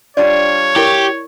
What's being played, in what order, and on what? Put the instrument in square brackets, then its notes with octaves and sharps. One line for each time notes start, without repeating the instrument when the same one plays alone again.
[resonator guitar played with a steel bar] G3 D4 F4 [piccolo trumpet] C#5 [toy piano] D5
[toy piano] E4 A#4 C#6 [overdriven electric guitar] G4